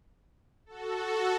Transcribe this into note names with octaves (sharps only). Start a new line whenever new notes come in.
F#4 A4